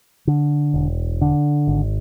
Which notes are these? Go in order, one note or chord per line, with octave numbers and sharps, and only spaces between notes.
D3
E1
D3
G#1